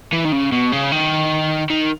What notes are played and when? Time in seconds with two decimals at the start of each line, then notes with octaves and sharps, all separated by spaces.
0.13 E3
0.25 D#3
0.32 C#3
0.52 B2
0.72 C#3
0.92 D#3
1.70 D#3